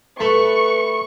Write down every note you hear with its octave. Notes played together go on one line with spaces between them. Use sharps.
A3 B4 C#6